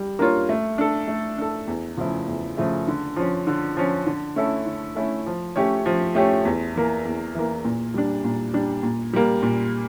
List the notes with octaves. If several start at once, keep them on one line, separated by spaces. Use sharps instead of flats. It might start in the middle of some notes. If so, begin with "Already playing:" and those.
Already playing: G3
A#3 D4 F4 C#5
A3
D4 A4
A3
D4 A4
E2
C#3 F3 A3 E4
E2
C#3 F3 A3 E4
D3
F3 C#4
D3
F3 C#4
D3
A3 C#4 E4 A4
D3
A3 C#4 E4 A4
F3
A3 C#4 G4 C#5
F3
A3 C#4 G4 C#5
E2
E3 A#3
E2
E3 A#3
A#2
G3 D4
A#2
G3 D4
A#2
G3 A#3
A#2